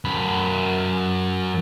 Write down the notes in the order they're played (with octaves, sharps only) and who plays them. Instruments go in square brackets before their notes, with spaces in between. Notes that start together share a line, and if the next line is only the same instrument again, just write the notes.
[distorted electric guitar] F#2 B5